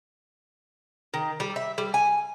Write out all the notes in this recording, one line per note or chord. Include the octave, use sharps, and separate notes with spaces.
D#3
G3
E5
G3
G#5